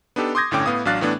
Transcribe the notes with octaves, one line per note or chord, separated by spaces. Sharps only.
B3 D4 D#4 G4 A4
C6 D6 D#6 G6 G#6 A#6
G1 A2 D3 C#4 G5 D6
A2 B3 F5 D#6
A1 F#3 D4 F5 F#6 A6
A2 E3 A3 B3 D4